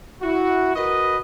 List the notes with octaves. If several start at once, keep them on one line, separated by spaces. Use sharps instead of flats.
E4 F#4
F#4 A#4 B4 D#5